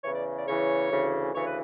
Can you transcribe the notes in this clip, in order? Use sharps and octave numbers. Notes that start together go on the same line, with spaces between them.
E2 C#3 E3 C#5
D5
D5
E2 C#3 E3 C#5
D2 C#3 E3
D2 C#3 E3 C#5
B4